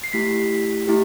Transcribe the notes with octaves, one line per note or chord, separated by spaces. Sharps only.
C7
A3 E4 G4 B6
A3 E4 G4